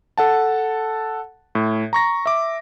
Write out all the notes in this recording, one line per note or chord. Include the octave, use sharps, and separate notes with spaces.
A4 F#5 A5
A2
A#5 C#6 A#6
E5 D6